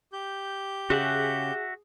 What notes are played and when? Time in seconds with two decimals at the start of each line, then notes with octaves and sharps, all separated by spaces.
0.13 G4 G6
0.90 C#3 F#4 G#4 E5 F#5